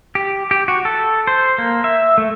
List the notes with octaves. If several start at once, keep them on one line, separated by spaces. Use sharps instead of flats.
G4
G4
F#4
A4
C5
A#3
E5
A3